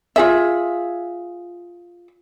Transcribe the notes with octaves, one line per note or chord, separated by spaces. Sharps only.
F4 G#4 E5